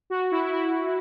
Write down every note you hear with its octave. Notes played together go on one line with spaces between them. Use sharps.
F#4
E4
E4